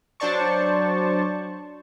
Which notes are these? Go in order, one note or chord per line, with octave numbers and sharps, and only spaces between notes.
F#3 D4 C5 D5 A5 C#6